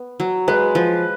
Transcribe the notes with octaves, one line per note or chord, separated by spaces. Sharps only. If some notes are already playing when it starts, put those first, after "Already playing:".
Already playing: B3
F#3
G#3 B4
F3